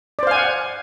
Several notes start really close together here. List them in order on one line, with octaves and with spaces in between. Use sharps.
D5 C5 F5 G#5 F#5